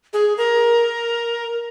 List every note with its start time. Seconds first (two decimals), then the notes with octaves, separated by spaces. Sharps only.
0.13 G#4
0.38 A#4